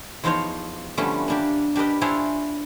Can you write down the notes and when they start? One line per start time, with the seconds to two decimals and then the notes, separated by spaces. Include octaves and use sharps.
0.24 E2 F3 D#4 F4 C5 C#5
0.97 D3 F3 G3 A3 B3 C#4
1.28 A#3 D4 G4
1.75 D4 G4 A#4 B4 D#5
2.01 D4 E4 F4 C5 C#5 G#5